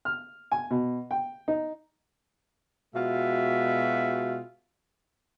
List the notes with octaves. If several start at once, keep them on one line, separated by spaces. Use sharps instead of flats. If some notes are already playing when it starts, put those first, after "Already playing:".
F6
G#5
B2
G5
D#4
B2 G#3 F4 F#4 E5